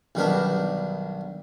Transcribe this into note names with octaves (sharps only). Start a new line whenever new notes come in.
B1 D#3 G3 B3 D4 A#4